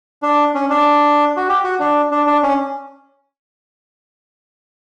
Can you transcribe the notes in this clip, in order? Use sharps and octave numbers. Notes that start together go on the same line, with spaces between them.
D4
C#4
D4
F#4
G4
F#4
D4
D4
D4
C#4